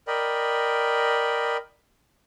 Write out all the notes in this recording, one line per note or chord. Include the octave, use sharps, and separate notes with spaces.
A#4 D5 D#5 G5 B5